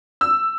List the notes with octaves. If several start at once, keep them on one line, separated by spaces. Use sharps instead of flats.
E6